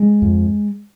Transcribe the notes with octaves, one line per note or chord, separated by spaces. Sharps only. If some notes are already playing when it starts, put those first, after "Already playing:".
Already playing: G#3
F2